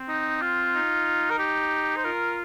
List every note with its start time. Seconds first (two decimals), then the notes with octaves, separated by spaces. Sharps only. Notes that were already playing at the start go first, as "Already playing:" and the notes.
Already playing: C4
0.09 D#4
0.41 F4
0.74 D#4
1.30 A#4
1.39 G4
1.96 C5
2.04 F4 A#4